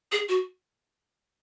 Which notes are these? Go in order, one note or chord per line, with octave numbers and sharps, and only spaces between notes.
G#4
F#4